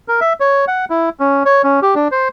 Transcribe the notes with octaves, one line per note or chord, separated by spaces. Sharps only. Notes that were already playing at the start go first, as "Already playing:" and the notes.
A#4
E5
C#5
F#5
E4
C#4
C#5
C#4
G4
D4
C5